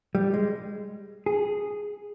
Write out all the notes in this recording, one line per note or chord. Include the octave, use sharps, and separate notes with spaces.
G3
G#3
G#4